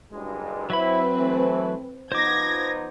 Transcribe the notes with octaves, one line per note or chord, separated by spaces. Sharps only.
F#1 G2 G#3
F#3 C4 E4 B4 E5 B5
E3 A3
F3 B3 D#4 C5 D6 G#6 A#6